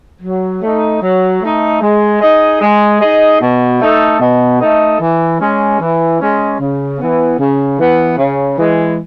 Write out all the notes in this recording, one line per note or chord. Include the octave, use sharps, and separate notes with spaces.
F#3
A3 D#4
F#3
A3 D#4
G#3
D#4 G#4 D#5
G#3
D#4 G#4 D#5
B2
A3 D#4 A4 D#5
B2
A3 D#4 A4 D#5
E3
G#3 C#4
E3
G#3 C#4
C#3
E3 B3
C#3
E3 B3
C#3
E3 G#3